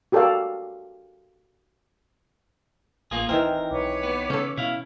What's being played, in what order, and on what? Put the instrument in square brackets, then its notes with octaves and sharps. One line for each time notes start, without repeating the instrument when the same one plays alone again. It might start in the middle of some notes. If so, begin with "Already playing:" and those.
[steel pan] F#4 G4 A4 A#4 D5 F5
[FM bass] A1 [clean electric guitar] A#3 F4 G#4
[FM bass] D1 [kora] D#3 E3 C4 [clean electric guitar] A#4
[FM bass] B1 [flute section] B4 C#5 D6
[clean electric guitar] B3
[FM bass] C#3 [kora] C#4 A4
[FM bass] B2 [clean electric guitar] E4 F5